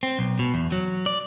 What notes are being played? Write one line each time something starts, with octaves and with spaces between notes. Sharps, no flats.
C4
B1
B2
E2
F#3
D5